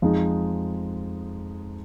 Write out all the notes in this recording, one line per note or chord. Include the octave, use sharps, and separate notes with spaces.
F2 F3 G#3 D#4